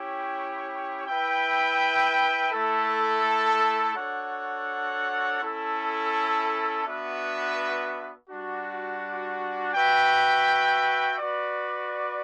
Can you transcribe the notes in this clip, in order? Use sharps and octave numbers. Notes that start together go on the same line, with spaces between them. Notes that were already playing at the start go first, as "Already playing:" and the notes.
Already playing: C#4 E4 G4 C#5 G5
E4 B4 E5 G5
A3 E4 A4
D4 F#4 A4 C#5 F#5
C#4 E4 A4
B3 D4 F#4 B4 E5
G3 D4 F#4
F#4 B4 E5 G5
F#4 B4 D5